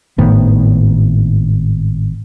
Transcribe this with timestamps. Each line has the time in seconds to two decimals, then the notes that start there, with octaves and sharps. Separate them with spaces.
0.18 G#1 A2 D#3 B3